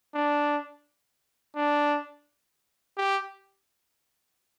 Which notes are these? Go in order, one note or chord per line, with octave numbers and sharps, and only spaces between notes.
D4
D4
G4